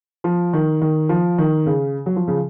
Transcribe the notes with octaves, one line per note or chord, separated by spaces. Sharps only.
F3
D#3
D#3
F3
D#3
C#3
F#3
F3
C#3